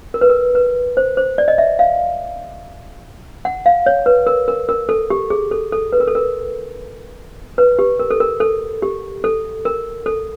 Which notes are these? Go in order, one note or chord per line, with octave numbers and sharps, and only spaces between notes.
A#4
B4
A#4
B4
C5
C5
D5
D#5
E5
F5
F#5
F5
C#5
B4
A#4
A#4
A#4
A4
G4
G#4
A4
A4
B4
A#4
A4
A#4
B4
G4
A#4
A4
A#4
A4
G4
A4
A#4
A4